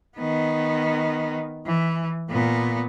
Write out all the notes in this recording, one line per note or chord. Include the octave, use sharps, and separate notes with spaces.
D#3 B3
E3
A#2 B3